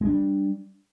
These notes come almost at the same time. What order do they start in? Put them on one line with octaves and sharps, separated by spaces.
G#3 D4 G3